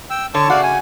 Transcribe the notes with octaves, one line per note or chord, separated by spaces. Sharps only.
G5 E6
D3 C#5 A5 C#6
C#3 A3 F#4 D5 F5 F#5
G#5